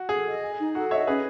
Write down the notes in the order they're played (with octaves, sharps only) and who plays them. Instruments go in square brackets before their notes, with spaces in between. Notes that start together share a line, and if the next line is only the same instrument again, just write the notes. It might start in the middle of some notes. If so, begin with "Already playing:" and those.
Already playing: [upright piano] F#4
[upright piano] G#4 [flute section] A4
[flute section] D#5
G#5
D#4
[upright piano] F#4 [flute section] A4
[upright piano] C#5 E5 [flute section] D#5
[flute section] C#4 [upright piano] G#4 B4